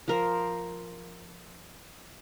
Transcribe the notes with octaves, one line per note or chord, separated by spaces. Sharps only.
F3 A#4 C5